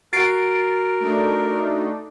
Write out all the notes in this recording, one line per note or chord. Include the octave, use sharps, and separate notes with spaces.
F#4 A#4 F#5 A6 C7 D7
A3 D4 D#4